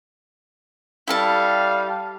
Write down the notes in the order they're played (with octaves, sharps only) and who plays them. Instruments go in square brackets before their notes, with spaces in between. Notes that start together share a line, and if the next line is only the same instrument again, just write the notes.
[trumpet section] G3 F5 [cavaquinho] E4 A4 A5